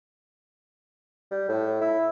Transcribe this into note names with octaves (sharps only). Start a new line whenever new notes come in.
G3
A2
E4